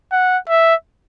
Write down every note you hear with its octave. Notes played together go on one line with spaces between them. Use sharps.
F#5
E5